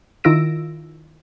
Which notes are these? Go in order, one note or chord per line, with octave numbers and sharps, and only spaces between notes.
D#3 E4 F4 E6 A#6 D7